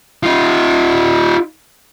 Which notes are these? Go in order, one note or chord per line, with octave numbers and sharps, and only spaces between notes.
D#4 F4